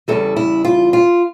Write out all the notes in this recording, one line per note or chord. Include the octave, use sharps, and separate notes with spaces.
E2 C#3 E3 G3 A4
E4
F4
F4